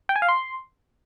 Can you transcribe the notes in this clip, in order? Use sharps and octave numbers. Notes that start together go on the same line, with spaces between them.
G5
G#5
F5
C6